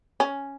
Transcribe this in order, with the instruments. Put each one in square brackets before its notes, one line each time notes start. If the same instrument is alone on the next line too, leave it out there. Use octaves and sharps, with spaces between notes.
[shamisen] C#4